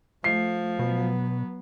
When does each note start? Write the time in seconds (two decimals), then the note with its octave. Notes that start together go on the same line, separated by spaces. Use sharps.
0.24 F3 A3 C7
0.79 B2 F#3 B3